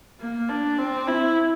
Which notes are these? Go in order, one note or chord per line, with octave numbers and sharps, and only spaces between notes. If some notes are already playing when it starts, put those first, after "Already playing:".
A#3
D4
C4
E4